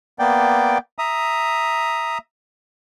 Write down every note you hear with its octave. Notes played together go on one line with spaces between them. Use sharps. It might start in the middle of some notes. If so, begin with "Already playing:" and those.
A#3 B3 D5 G5
E5 A#5 D#6